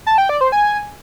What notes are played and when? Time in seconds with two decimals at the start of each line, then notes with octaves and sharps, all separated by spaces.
0.07 A5
0.18 G5
0.29 D5
0.41 C5
0.52 G#5